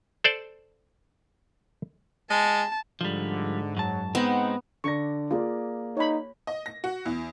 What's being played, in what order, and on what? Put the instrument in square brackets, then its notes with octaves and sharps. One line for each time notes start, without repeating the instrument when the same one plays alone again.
[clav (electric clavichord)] A4 C5 D5
[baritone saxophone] G#3 [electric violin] A5
[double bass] G#2 [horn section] D3 [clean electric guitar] F3 G3
[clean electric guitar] F#2 A5 [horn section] F#3
[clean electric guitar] G#3 C4 [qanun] B3 [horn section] D#4 F#5
[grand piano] D3 D5 A#6 [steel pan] C#6
[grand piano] A#3 G#4 D5 [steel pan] F4
[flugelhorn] D#4 [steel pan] C#5 B5
[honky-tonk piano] D#5
A#6
F#4
E2